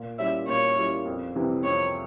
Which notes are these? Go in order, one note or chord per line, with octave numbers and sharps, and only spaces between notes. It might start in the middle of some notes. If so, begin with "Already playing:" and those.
Already playing: A#2
G3 C#4 E4 E5
A#2 C#5
G3 C#4 E4
F2
C3 E3 G3 C4
F2 C#5